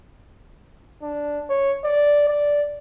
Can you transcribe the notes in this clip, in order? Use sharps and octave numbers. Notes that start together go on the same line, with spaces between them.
D4
C#5
D5
D5